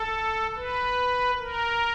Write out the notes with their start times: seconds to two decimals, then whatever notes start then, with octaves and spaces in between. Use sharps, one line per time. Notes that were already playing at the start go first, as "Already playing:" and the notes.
Already playing: A4
0.56 B4
1.39 A#4